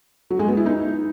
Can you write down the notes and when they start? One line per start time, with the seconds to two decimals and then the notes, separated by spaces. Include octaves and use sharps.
0.30 F#3
0.39 G#3
0.48 B3
0.57 E4
0.66 D#4